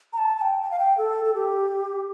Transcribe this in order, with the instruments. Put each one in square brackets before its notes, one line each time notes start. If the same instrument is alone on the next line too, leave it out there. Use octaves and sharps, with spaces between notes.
[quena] A#5
A5
A5
G5
G5
F5
G5
A4
A4
G4